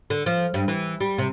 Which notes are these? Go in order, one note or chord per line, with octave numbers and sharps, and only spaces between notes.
D3
F3
G2
E3
G3
C3